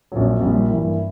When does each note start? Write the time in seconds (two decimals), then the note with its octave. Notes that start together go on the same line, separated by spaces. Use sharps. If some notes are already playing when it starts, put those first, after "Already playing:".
0.12 A#1 A#2 F#3
0.40 A#1 A#2 G3
0.70 G2 E3 A#3 E4